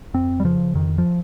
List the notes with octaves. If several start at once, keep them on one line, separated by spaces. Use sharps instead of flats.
F2 C4
G3
C#3 F3
F2 D#3
F3